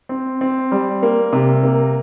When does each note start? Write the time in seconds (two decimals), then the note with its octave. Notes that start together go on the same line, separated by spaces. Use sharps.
0.09 C4
0.41 C4
0.72 G3
1.03 A#3
1.33 C3
1.63 A#3